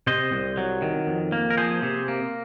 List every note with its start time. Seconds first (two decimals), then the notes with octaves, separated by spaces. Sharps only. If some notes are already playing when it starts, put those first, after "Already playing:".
0.07 C3 C5 D#5
0.32 C2
0.57 F#3
0.82 D#3
1.07 F2
1.32 A#3
1.50 A#4
1.57 F3 G#4 C5
1.83 C3
2.08 A#3